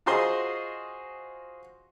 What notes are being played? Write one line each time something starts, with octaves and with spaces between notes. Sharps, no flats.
F4 F#4 G#4 C5 D#5 C6